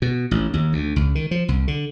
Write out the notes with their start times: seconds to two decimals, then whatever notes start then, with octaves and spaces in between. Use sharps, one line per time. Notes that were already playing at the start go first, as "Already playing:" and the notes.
0.02 B2
0.31 A1
0.54 D#2
0.73 D2
0.96 C#2
1.15 D#3
1.31 F3
1.48 C2
1.68 D3